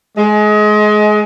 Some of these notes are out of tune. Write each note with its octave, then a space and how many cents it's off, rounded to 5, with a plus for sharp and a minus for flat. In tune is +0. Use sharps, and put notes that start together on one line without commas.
G#3 +25